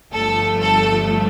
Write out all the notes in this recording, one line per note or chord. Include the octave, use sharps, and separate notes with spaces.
G1 G2 F3 A3 A4
A4